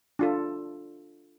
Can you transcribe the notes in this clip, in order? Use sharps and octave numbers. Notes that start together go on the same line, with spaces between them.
D4 F4 A4